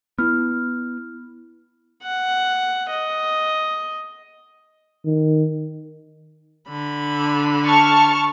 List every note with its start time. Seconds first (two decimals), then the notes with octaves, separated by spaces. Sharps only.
0.18 B3 E4 F6
2.03 F#5
2.90 D#5
5.05 D#3
6.69 D3 B5
7.64 A5 C#6 F6